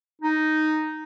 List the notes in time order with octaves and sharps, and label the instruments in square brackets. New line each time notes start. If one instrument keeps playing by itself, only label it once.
[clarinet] D#4